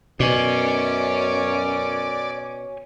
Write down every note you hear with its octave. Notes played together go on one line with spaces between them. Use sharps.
F#2 B2 C#5 D5 G#5